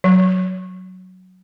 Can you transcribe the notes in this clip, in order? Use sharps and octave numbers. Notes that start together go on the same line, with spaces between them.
F#3